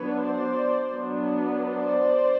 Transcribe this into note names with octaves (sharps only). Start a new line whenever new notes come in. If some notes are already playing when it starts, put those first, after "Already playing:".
Already playing: F#3 B3 D4 B4 C#5
C5 D5
F#3 B3 D4
C5 D5